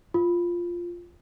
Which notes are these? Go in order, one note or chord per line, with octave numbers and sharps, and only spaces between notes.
F4